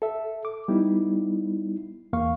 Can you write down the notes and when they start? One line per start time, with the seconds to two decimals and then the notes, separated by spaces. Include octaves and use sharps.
0.02 A4 E5
0.45 D6
0.68 G3 B3 D#4 E4
2.13 E2 A#3 F5 C#6